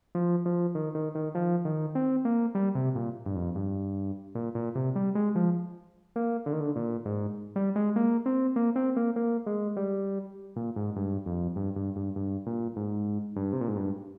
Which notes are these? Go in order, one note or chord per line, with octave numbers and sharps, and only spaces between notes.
F3
F3
D#3
D#3
D#3
F3
D#3
C4
A#3
G3
C3
A#2
G2
F2
G2
A#2
A#2
C3
G3
G#3
F3
A#3
D3
D#3
D3
A#2
G#2
G3
G#3
A#3
C4
A#3
C4
A#3
A#3
G#3
G3
A#2
G#2
G2
F2
G2
G2
G2
G2
A#2
G#2
G2
C3
A#2
G#2
G2